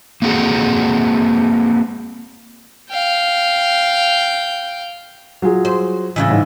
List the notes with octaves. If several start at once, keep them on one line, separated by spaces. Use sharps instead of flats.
A#3 C4 F#4 G#4 A4
F5 G5
F#3 F4 G#4
C5
A2 C#3 E3
G#2